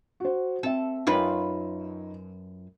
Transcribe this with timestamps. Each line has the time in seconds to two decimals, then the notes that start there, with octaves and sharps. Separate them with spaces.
0.20 F#4 C5
0.63 C4 A4 E5
1.07 F#2 D#4 F4 B4 C#5